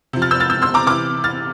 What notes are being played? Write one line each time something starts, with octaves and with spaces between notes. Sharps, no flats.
C3 F3
F6 A6
E6 G6
F6 A6
E6 G6
C6 E6
A#5 D6
C3 E3 D6 F6
F6 A6